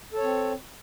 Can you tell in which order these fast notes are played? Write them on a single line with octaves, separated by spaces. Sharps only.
A4 C#5 C4